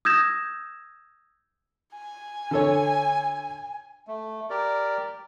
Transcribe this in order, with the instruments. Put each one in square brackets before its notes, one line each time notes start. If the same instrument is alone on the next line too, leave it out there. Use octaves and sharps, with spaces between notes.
[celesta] D#6 E6 G6 G#6 A#6 E7
[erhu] G#5
[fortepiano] D3 A4 C#5
[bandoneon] A3
G4 A#4 D5